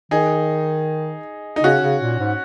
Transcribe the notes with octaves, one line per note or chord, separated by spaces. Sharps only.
D#3 D#4 G#4
D#4
C#3 C#4 F#4
C#3
A#2
G#2